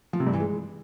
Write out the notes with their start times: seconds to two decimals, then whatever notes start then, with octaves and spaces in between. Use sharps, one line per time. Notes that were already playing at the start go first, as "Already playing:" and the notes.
0.13 F3
0.20 C3
0.27 G2
0.33 E3
0.40 G#3